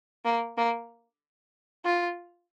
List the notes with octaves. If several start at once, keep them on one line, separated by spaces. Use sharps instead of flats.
A#3
A#3
F4